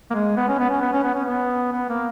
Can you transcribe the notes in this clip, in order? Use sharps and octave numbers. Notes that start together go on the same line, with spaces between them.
A#3
G#3
B3
C#4
B3
C#4
B3
C#4
B3
C#4
B3
B3
A#3